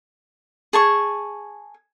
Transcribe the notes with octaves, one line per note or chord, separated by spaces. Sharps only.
G#4 A5 C#6